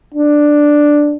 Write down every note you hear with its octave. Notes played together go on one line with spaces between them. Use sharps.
D4